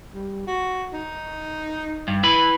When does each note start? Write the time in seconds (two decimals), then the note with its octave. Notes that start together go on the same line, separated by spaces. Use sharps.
0.14 G3
0.47 F#4
0.93 D#4
2.08 G2
2.23 E4 B4 B5